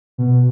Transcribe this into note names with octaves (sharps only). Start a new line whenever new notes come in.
B2